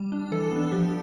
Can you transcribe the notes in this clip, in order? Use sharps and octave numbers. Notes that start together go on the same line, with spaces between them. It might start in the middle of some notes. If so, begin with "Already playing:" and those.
Already playing: G3
D4
E3 A4
B3 D4
F3 G4